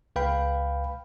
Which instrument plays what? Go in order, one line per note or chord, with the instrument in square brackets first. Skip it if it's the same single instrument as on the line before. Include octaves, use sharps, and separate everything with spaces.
[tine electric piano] C#2 B4 F5 G5 B5